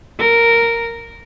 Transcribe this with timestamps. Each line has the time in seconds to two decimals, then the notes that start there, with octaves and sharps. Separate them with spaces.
0.19 A#4